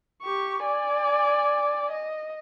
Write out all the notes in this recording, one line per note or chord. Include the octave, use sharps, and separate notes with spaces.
G4 C#6
D5 G#5
D#5